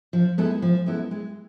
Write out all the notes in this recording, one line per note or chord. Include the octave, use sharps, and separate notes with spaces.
F3
G#3 B3 E4 A4
F3
G#3 B3 E4 A4
G#3